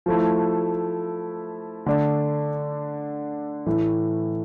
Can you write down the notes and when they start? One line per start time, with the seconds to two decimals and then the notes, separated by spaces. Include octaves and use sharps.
0.06 F3 A3 E4
1.86 D3 A3 D4
3.66 A2 E3 A3